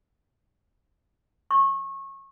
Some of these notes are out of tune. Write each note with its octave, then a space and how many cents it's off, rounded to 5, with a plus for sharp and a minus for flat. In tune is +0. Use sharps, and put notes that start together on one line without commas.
C#6 -25